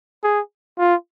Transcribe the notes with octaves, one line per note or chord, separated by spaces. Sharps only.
G#4
F4